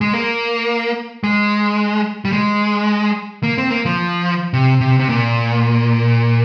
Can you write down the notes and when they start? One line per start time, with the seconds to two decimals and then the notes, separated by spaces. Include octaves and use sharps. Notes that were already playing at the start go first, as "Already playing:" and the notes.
0.01 G#3
0.13 A#3
1.24 G#3
2.25 G3
2.33 G#3
3.43 A#3
3.58 C4
3.70 A#3
3.85 F3
4.53 C3
4.80 C3
4.99 C3
5.09 A#2